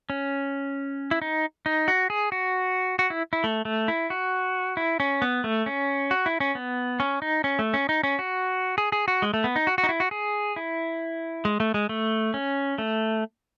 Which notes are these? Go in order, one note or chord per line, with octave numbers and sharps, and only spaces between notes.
C#4
E4
D#4
D#4
F#4
G#4
F#4
F#4
E4
E4
A3
A3
E4
F#4
E4
C#4
B3
A3
C#4
F#4
E4
C#4
B3
C#4
D#4
C#4
A3
C#4
D#4
C#4
F#4
G#4
G#4
F#4
G#3
A3
B3
D#4
F#4
F#4
D#4
E4
F#4
G#4
E4
G#3
A3
G#3
A3
C#4
A3